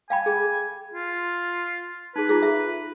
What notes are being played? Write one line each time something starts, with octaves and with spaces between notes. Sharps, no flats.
F5 G5 G#5 B5
G#4
F4
D#4 G#4 B4
F4 G#4
E5